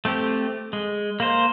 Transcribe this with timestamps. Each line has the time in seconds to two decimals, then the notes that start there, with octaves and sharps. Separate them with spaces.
0.05 A3 C4 G4
0.73 G#3
1.20 A#3 C5